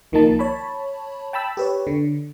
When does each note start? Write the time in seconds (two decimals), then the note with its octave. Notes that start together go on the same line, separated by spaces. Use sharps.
0.12 C2 D#3 F3 A#3 D#4 A5
0.39 C#5 A5 B5
1.33 G5 A5 B5 E6
1.57 G4 B4 C#5
1.87 D3